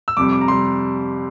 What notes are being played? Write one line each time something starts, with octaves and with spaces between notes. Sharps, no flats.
E6
F2 C3 G3 D6
D6
A#5
C3 G3 C6